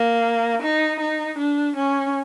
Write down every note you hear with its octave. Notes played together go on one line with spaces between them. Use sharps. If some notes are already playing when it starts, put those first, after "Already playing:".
Already playing: A#3
D#4
D#4
D4
C#4